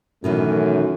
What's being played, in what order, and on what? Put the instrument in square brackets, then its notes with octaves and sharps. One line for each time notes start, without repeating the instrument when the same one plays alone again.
[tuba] F#2 [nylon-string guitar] B2 D#3 E3 [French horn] A3